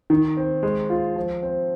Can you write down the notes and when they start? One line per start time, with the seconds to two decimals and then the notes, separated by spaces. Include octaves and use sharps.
0.10 D#3
0.37 C4
0.63 G#3
0.90 F4
1.16 F3
1.43 C4